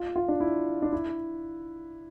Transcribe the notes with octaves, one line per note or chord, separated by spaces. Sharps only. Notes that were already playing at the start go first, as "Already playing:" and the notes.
Already playing: F4
F4
D4
E4
D4
E4